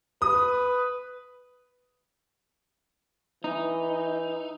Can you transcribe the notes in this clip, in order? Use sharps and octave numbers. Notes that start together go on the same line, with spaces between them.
B4 D#6
E3 D#4